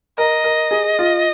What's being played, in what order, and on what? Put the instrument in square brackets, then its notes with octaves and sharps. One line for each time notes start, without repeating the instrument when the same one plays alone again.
[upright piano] A#4 [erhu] D#5
[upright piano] A#4
G#4
F4